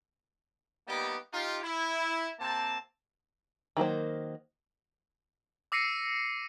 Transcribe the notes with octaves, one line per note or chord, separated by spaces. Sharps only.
G3 A#3 B3 D#4 G4
D#4 F4 G4
E4
C3 A#3 C4 A5
D#3 F#3 A#3 C5
D6 E6 A#6 C7 C#7 D#7